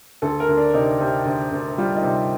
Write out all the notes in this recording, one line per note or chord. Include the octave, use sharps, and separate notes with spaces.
D2 A4
A#4
D2
D4
C3 D#4
C3
D2
D2
G3 F4
D#4
C3